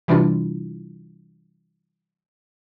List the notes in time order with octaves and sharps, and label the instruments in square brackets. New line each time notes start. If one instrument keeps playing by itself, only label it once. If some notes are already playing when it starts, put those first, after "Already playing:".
[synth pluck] C3 E3 G3 D4 E4 F4